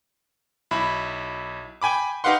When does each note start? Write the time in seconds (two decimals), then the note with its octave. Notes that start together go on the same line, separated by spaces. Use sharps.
0.71 B1 E4 B5
1.82 G5 G#5 B5 D6
2.24 D#4 G4 B4 F5 F#5 C6